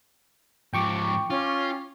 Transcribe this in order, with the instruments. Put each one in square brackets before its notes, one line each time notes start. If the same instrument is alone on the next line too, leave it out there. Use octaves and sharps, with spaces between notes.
[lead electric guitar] G#2 F3 [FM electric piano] G5 C#6 D6
[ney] C#4 [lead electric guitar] F4